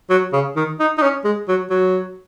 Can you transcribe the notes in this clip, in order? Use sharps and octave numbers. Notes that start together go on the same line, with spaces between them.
F#3
C#3
D#3
D#4
D#4
C#4
G#3
F#3
F#3